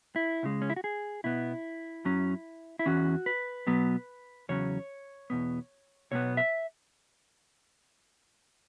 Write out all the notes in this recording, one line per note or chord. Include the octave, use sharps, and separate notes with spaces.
E4
C#2 C#3 G#3
C#4
E4
F#4
G#4
B2 B3 E4
F#2 F#3 C#4
E4
E2 E3 C#4 F#4
B4
B2 F#3 B3
E2 C#3 F#3 C#4 C#5
E2 B2 B3
B1 B2 B3 C#5
E5